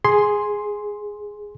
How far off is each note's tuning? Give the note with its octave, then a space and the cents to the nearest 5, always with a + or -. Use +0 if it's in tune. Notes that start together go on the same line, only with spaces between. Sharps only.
G#4 +0 C6 +0